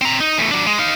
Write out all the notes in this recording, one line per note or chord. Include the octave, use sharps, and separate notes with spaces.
C4 A#5
D#4
E2 A3
F#3 D4
G#3
D#4 F5